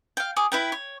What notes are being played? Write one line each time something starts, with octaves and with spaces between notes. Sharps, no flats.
F5 G5
G#4 D6
E4 B4 G5
C#5